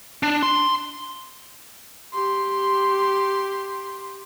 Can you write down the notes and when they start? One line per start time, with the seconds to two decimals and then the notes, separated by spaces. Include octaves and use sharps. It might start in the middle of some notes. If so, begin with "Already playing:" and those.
0.23 D4
0.43 C6
2.13 G4 C6